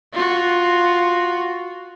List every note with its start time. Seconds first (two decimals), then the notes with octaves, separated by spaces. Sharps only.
0.14 F4 F#4